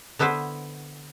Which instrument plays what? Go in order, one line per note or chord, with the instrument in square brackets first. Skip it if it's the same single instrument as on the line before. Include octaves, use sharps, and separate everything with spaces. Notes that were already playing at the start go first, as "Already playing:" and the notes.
[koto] D3 B3 E4 B4 C5